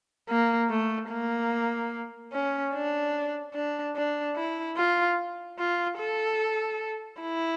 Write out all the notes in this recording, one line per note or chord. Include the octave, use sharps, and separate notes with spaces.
A#3
A3
A#3
C#4
D4
D4
D4
E4
F4
F4
A4
E4